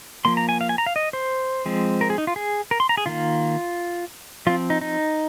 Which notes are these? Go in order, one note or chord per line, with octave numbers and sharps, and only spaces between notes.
F3 A#3 C6
A#5
G#5
F5
G#5
A#5
F5
D#5
C5
F3 G#3 C4
A#4
G#4
D#4
F4
G#4
A#4
C6
A#5
G#4
D#3 A#3 F4
F3 C4 F4
D#4
D#4